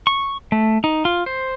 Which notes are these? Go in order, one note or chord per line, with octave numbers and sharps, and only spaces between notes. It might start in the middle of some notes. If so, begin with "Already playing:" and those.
C#6
A3
D#4
F4
C5